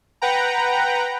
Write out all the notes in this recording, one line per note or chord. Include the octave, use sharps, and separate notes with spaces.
B4 F#5 G5 A#5